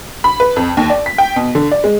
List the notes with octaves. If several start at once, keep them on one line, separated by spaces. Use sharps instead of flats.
B5
B4
F2
D#2
D5
B6
G5
B2
D3
D5
G#3